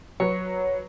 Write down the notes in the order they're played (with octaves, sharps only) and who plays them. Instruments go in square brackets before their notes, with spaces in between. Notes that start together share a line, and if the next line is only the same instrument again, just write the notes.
[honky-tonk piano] F#3 B4 [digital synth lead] C#5